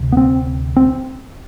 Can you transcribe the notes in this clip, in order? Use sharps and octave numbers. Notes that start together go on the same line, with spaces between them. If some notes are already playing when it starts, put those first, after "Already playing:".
Already playing: D2 C3
B3
C4
C4